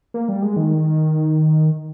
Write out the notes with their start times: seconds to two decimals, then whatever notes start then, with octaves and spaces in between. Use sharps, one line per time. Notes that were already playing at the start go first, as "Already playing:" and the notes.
0.14 A#3
0.29 G3
0.42 G#3
0.57 D#3